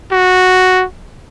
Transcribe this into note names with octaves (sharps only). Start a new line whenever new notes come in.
F#4